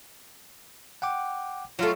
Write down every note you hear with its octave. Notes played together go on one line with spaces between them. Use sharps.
F#5 G5 D6
F#3 A3 F4